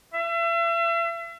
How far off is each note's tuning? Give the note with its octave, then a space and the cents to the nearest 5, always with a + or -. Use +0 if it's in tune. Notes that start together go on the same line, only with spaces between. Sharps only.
E5 +40